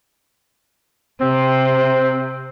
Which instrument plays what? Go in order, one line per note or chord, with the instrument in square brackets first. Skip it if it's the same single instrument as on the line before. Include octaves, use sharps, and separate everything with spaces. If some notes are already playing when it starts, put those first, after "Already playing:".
[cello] C3 [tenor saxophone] C4